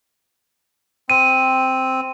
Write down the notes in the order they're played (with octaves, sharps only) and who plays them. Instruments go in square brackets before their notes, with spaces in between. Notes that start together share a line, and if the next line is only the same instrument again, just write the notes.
[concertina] C4 [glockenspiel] D#7